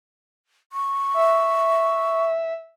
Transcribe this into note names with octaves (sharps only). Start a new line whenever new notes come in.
C#6
E5